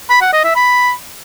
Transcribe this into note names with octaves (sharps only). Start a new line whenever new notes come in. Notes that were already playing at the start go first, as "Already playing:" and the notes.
B5
F#5
D#5
E5
B5